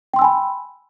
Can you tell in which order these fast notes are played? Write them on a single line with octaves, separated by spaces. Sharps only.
G5 C6 E6 G#5 B5